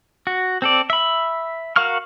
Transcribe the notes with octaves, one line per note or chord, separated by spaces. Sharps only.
F#4
C4 A4 D5
E5 B5
F#4 A#4 F5 C#6 F6